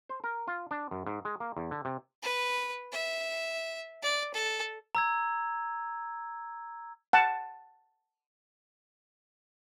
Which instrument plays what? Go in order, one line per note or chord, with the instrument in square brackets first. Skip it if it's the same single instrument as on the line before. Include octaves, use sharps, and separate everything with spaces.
[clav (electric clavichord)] C5
A#4
F4
D4
F#2
G#2
G#3
A#3
E2
D3
C3
[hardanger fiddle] B4
E5
D5
A4
[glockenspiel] A#5 E6 G#6
[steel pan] F#5 A5